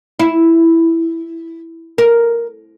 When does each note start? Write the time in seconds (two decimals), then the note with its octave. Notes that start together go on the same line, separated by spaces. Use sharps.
0.19 E4
1.98 A#4